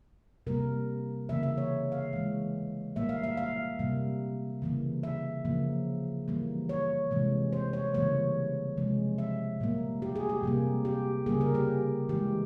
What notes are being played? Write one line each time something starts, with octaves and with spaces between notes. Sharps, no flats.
C3 G3 A#3 A#4
C#3 E3 A#3 E5
E5
C#5
F5
E3 G#3
A#2 G3 A#3 E5
F5
E5
F5
C3 G3 A#3
C#3 E3 A#3
E5
C#3 F3 A#3
E3 G3 A#3
C#5
C3 E3 G#3
C5
C#5
C#3 E3 G3 A#3 C#5
C3 F3 G#3
E5
A#2 G3 A#3
G4
G#4
G4
C3 G3 A#3
G4
C#3 G3 A#3 G#4
A#4
G4
E3 G#3 G4